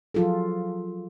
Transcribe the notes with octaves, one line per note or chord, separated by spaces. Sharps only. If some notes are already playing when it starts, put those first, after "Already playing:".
F3 F#3 F4 G#4 A4